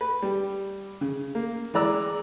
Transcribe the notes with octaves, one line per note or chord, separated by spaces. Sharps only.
B4
G3
C#3
A#3
E3 G#3 D5 A#5 E6